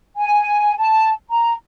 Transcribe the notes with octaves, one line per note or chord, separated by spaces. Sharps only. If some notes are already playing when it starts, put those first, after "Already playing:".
G#5
A5
A#5